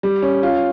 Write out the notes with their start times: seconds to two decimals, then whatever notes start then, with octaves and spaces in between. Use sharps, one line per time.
0.03 G3
0.22 C#4
0.43 F4